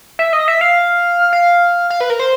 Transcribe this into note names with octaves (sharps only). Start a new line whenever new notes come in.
E5
D#5
E5
F5
F5
F5
B4
A#4
C5